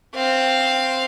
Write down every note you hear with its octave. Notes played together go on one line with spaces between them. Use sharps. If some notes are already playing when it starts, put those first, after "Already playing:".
C4 F5